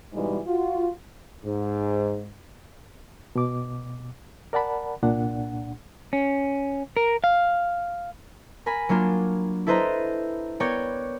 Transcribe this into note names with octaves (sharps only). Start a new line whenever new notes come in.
G#2 B2 E3 G3 G#3
F4 F#4
G#2
B2 D6
A#4 D5 F#5 A5 B5
C2 A#2 D4 F#5
C#4
A#4
F5
A#4 G#5 B5
F#3 A#3 D4 F4
E4 A4 B4 C5 D#5 A#5
B3 A#4 C#5 D5 G5 G#6